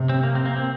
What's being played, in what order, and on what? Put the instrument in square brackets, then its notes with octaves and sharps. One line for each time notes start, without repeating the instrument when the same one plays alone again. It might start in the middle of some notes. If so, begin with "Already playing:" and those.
Already playing: [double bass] C3
[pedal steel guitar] C4
A#3
C4
A#3
C4